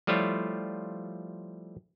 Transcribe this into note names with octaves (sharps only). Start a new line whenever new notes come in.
F3 G3 A3 E4 F4 C#5